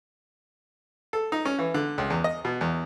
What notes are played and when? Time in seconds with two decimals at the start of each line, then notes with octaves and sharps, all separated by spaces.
1.13 A4
1.32 D#4
1.45 C#4
1.59 E3
1.74 D3
1.98 C#2
2.10 E2
2.24 D#5
2.45 B2
2.61 E2